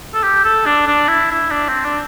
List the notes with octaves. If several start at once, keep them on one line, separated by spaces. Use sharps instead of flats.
A4
G4
A4
D4
D4
E4
E4
D4
C4
D4